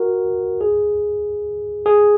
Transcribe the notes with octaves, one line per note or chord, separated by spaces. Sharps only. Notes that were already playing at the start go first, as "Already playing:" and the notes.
Already playing: F#4 A#4
G#4
G#4